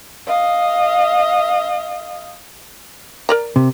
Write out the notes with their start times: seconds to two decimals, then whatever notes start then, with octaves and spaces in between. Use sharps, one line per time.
0.27 D#5 F5
3.29 A#4 D5 A#5
3.56 C3